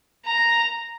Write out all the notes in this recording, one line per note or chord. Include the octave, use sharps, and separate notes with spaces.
A#5